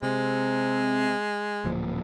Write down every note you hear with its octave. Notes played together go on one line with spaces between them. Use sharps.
C3 G#3
D1 A#2 F3